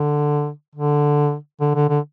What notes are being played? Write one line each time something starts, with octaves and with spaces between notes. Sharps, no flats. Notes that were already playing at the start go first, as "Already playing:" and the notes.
Already playing: D3
D3
D3
D3
D3